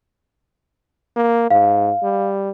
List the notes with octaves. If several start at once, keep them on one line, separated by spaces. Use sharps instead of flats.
A#3
G#2 F5
G3